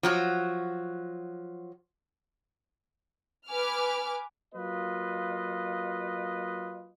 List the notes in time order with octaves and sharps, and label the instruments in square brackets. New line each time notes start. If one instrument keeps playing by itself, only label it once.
[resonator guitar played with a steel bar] F3 F#3 F#4
[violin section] B4 G#5 D6 F6
[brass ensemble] F#3 A#3 F4 B4 D#5